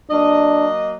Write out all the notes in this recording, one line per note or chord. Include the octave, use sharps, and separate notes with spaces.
F#3 A#3 D4 D#5